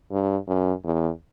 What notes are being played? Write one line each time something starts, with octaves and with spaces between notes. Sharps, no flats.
G2
F#2
E2